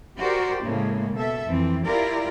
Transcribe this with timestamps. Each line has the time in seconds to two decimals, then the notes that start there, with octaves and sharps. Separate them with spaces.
0.18 F#4 G4 A#4 C5 D5
0.63 A2 C#3 G#3 A#3
1.14 B2 A4 E5
1.47 F2 E3 C4
1.83 E4 F4 G4 A#4 D5